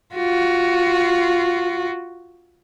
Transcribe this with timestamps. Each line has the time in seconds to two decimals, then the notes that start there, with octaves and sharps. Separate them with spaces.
0.15 F4 F#4